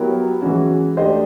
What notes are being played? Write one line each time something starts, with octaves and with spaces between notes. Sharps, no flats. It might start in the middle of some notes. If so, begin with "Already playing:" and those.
Already playing: F#3 B3 E4 G4 A#4
E3 G#3 C#4 F#4
A3 D4 G4 C5 D#5